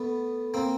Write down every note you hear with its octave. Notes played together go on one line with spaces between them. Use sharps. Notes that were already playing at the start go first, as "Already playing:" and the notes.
Already playing: A3 B3
A#3 C4